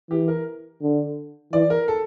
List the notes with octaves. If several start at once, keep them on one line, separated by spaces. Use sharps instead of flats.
E3 G4
A#4
D3
E3 D5
A#4
A4